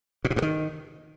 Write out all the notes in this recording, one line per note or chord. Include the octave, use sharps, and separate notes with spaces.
A#2
B2
G2
D#3